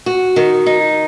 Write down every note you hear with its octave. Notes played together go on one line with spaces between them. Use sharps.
F#4
D#3
D#4